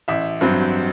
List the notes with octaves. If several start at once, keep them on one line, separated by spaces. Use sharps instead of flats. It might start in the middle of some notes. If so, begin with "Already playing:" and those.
A1 E5
G2 F#3 C4